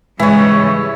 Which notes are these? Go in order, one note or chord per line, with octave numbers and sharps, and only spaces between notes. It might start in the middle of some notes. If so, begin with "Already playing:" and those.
G#2 C#3 E3 G3 G#3 E4 C#5